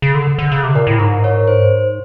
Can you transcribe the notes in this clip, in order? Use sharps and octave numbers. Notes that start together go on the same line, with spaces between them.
C#3
D3
D3
C#3
C3
A#2 A#4
A2
G#2 A#4
C#5
C5